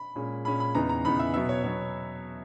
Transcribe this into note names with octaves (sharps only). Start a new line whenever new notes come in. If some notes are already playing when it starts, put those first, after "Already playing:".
Already playing: B5
A#2 G#3 C#4
A#2 G#3 C#4 B5
B5
E2 C#3 E3 B3 D#4 A#5
A#5
E2 C#3 E3 B3 D#4 B5
E5
B2 F#3 B3 E5
C#5
B2 F#3 B3 C#5